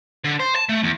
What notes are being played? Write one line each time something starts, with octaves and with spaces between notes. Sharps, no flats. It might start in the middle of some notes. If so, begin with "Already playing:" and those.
D3
C5
A5
A3
E2